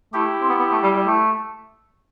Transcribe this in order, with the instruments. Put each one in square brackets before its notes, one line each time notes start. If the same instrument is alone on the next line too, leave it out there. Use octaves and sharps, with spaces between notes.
[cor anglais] A3 [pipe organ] E4 G4
[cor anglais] C4
B3
B3
A3
G3
G3
A3